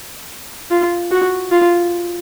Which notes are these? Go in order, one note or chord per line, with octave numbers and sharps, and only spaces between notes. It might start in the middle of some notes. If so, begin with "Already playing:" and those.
F4
F#4
F4